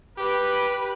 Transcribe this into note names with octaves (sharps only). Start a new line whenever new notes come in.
G4 B4